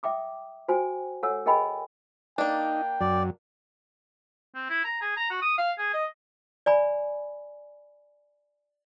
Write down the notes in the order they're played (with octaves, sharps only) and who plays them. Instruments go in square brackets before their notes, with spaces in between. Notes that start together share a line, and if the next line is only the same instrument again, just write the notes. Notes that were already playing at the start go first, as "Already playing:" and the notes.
[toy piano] E5 G5 D6 D#6
F#4 C5 G5 G#5
A4 C#5 F#5 G#5 E6
G#4 A#4 D#5 G5 G#5 B5
[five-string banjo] A#3 D4 [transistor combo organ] D#4 [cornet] G5
[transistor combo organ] F#2 F#3 [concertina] D5
[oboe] C4
E4
A#5
G#4
A#5
F#4
D#6
F5
G#4
D#5
[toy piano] D5 G#5 B5